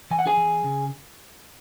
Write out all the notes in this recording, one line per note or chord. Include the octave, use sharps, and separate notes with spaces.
E3 G#5
F#5
G#4 G#5
E3
C#3